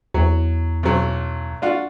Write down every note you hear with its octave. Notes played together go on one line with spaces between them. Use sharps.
E2 F#3
B1 F#2 F#3
D4 F4 F#4